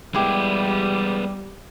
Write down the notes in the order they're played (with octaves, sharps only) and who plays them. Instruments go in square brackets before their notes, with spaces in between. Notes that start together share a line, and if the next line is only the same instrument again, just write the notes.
[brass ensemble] G3 [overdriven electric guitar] G#3 B3 [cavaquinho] E4 G4